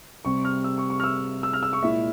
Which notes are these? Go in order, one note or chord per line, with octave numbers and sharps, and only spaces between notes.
C3 G3 C4 C#6
F6
E6
C#6
C#6
F6
E6
E6
F6
E6
C#6
A#2 G#3 E4 E5